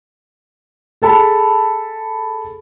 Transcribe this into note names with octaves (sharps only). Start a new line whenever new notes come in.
G#4 A4 A5 B5